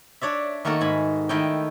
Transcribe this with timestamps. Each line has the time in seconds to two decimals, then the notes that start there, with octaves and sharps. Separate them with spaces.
0.21 D4 C#5 D5 E5
0.65 D#3 A3 A#3 F#4 A4
0.81 G#2 G#5 B5
1.29 D#3 A3 E4 D#5 G5